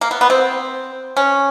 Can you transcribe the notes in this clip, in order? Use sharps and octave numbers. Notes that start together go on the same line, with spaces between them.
A#3
B3
B3
C4
C#4